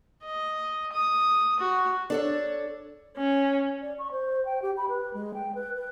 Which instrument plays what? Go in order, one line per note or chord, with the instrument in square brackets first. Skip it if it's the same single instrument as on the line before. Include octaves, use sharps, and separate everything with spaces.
[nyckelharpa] D#5
D#6
F#4
[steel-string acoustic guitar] D4 A4 C#5
[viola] C#4
[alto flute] D5
C#6
C5
G5
G4
B5
B4
G#3
G5
B4
B4